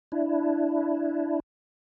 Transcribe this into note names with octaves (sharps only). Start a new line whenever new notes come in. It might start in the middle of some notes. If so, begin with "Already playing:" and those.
D4 E4